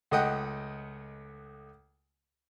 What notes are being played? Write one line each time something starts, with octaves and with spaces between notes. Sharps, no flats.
C#2 A3 D#5 F#5 G5